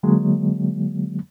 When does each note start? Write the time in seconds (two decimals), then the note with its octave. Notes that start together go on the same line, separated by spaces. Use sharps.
0.03 D3 F#3 G#3 A#3